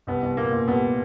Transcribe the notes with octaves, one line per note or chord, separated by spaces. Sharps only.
C2 B3
C2
A#2 A#3
A#2
C2 B3